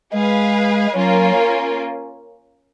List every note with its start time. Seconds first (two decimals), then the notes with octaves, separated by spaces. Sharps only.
0.13 G#3 G#4 B4 F5
0.95 F#3 A#3 C#4 F4 A#4